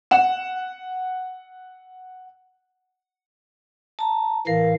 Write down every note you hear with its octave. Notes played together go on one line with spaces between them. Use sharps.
F#5 E7
A5 A#5
A2 E3 A#4 F5